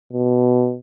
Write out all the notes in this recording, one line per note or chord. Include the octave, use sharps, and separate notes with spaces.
B2